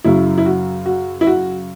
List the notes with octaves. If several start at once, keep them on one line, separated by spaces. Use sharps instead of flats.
F#2 C#3 F#3 E4
E4
F#4
F#4
E4
F#4